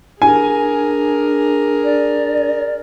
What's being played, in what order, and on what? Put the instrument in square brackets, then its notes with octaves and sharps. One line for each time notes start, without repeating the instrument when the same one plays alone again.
[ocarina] D4 [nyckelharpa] G#4 A#4 [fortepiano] G#5
[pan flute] D5